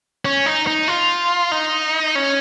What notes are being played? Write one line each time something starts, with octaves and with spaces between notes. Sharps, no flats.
C#4
D#4
D#4
F4
D#4
C#4